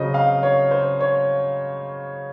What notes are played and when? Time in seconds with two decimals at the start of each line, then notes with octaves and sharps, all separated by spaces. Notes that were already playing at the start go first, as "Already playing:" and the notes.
Already playing: C#3 F#3 C4 D#5
0.14 F5
0.43 C#5
0.71 C5
1.01 C#5